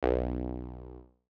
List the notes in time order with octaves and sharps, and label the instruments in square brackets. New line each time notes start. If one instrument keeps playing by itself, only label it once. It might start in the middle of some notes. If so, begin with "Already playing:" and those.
[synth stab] B1